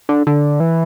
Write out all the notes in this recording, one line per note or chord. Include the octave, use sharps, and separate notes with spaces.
D3
D3
E3